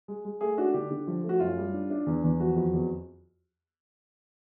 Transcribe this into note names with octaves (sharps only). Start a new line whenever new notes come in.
G#3
G#3
A3 G#4
D4 F#4
D3 G4
D3
F3
A3
F#4
F#2 F4
G3
D4
D4
E2
E2
F3 F#4
F2
E2